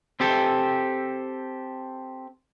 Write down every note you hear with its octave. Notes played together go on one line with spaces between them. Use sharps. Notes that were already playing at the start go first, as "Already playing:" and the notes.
C4 G4 A4